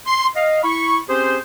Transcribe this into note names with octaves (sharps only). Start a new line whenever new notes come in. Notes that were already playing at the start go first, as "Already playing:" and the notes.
C6
D#5 F5
E4 B5 C#6
C4 C#4 G4 G#4 C5